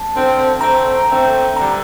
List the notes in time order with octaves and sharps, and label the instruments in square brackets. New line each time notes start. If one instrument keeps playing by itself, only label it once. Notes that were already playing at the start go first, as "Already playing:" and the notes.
Already playing: [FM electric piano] A5
[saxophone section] D3 F3 C4
[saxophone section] D3 A3 C4 [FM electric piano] A#5
[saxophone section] D3 A3 C4
[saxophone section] G2 D3 G3 [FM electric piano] A#5